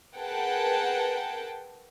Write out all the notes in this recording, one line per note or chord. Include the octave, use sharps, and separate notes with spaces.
G#4 A#4 B4 F#5 G5 A5